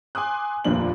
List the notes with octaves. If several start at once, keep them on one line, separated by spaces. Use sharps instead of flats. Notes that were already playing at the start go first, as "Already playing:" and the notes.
G#5 C6 D6 D#6 F#6
F1 D#2 A#2 F3 D4 F#7